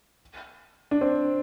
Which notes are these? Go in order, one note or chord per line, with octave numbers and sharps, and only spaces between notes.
D4
C4